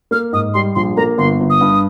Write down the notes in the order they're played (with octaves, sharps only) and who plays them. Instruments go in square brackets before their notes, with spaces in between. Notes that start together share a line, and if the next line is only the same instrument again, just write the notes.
[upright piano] A#3 [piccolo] F6
[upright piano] G#2 [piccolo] D#6
[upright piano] G3 [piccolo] C6
[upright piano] A#1 [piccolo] C6
[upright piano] A#3 [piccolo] A#5
[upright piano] G1 [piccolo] C6
[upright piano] G1
[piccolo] D#6
[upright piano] G2